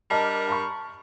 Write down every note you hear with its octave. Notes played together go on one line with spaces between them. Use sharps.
G3 D4 A#4 D#5 A5
A#5 B5 C#6